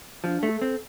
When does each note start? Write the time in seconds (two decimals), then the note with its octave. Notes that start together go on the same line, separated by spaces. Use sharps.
0.24 F3 D4
0.43 A3
0.49 A4
0.61 C4